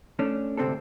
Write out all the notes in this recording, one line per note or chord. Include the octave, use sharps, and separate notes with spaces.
A3 C#4 D4
D2 G#2 C3 C4 D4 A4